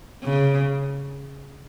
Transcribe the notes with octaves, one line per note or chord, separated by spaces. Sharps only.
C#3